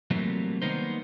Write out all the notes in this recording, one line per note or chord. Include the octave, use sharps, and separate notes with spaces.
C3 E3 F#3 G3 A3 A#3
D#3 G3 A#3 B3 D#4 C5